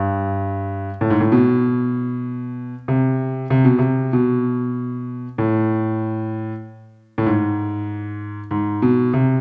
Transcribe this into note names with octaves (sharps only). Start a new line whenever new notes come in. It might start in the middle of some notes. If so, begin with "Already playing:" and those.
Already playing: G2
A2
G#2
A2
B2
C3
C3
B2
C3
B2
A2
A2
G#2
G#2
B2
C3